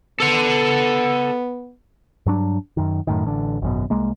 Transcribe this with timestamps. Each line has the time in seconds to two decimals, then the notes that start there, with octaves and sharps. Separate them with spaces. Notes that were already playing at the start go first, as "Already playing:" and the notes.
0.20 B3 A4 F#5
2.26 G2 F#3 D4
2.77 F#2 D#3
3.07 F#2 A2 D#3
3.25 A1 D3
3.62 G#1 F#2 B2
3.90 C2 G#3 A#3